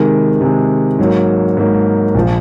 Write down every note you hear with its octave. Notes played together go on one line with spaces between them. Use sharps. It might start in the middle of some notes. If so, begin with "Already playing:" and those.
Already playing: C3 D#3 G#3
C3 D#3 G#3
G#2 F#3 A#3
G#2 F#3 A#3
A#1 F3